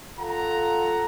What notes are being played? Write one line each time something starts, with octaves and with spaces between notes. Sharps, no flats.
F4 A4 F#5 A#5